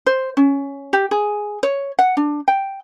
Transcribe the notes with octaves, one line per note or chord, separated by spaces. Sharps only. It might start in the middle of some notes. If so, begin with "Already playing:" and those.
C5
C#4
G4
G#4
C#5
F#5
D4
G5